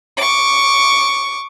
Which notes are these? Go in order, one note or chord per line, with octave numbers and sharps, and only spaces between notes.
C#6 D6